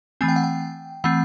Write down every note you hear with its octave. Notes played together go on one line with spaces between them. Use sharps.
E3 A3 C4 G#5
G5
F#5
G5
E3 A3 C4 F#5